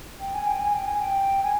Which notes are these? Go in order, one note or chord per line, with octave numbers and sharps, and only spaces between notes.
G5
G#5
G5
G#5
G5
G#5
G5
G#5